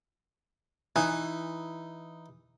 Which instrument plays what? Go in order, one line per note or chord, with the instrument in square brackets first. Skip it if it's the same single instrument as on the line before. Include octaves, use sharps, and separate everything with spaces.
[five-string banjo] E3 [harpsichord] D#4